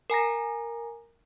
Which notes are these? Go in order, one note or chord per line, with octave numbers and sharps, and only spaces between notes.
A#4 G#5 A#5 A#6